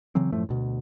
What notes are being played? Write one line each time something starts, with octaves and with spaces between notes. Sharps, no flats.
C#3 E3 F#3 C4
F#2 A2 F3 A3
D2 B2